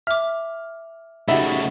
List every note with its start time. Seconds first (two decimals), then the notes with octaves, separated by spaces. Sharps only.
0.07 E5 D6 F6
1.29 C#3 A3 D#4 F#4 G4 E5 B5